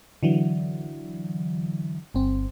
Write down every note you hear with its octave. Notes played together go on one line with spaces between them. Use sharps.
D3 E3 F#3
G1 C4